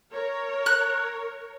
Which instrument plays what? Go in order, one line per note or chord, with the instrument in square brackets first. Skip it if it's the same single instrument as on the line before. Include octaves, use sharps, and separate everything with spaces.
[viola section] A#4 C#5
[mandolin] F#6